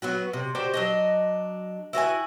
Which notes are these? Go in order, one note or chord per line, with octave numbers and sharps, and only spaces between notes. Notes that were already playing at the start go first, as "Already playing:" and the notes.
F#3 B3 F#4
C3
F#4 G4 C5 D5
F#3 D4 D#5
E4 F#4 B4 G#5